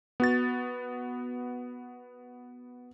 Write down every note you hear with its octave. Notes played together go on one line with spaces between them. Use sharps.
B3 F#4 A6